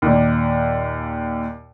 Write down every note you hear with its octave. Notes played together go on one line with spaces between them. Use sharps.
D#2 A#2